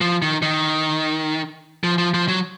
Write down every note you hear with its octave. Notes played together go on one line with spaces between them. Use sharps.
F3
D#3
D#3
F3
F3
F3
F#3